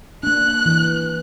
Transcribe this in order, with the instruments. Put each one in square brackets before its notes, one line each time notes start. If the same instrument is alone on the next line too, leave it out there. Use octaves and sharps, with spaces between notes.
[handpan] A#3 D4 [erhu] F#6
[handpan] E3